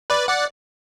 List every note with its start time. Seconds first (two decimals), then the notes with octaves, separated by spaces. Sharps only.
0.10 B4 D5
0.28 D5 F#5